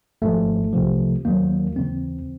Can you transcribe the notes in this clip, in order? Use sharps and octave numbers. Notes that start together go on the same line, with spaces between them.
G#1 G#2 F3 A3
C2 C3 F3
D#2 D#3 F#3 A#3
D#2 C#3 E3 C4